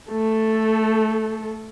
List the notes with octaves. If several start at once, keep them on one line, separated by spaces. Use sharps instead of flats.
A3 A4